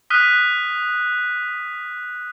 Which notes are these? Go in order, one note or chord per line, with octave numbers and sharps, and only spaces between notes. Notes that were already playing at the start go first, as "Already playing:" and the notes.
D#6 F6 F#6 B6 D#7